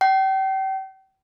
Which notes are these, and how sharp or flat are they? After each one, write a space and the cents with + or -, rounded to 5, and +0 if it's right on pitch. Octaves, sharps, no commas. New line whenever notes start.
G5 -35